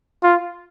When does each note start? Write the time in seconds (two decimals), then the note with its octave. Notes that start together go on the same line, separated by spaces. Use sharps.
0.23 F4